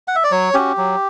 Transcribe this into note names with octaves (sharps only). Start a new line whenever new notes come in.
F#5
E5
D5
F#3 C#5
C#4 F#4 G4
F#3